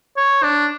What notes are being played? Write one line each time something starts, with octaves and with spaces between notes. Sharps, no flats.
C#5
D4